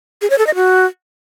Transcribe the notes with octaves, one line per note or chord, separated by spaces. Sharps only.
G#4
C#5
A4
D#5
F#4